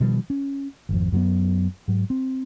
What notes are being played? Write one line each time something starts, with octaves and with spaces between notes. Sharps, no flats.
B2 D#3 F3 G3
C#4
G#1 F2
F#2 F#3 G#3 B3
G#2 F#3
C4